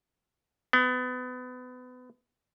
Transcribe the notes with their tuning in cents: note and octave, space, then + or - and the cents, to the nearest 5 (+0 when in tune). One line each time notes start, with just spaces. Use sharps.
B3 +30